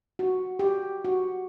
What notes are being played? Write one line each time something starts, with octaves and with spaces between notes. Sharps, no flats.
F#4
G4
F#4